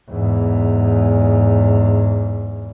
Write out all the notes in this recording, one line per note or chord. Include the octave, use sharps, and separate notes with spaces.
E2 G#2